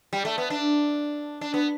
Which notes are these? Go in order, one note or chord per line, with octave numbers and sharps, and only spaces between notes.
G3
A3
B3
D4
D4
B3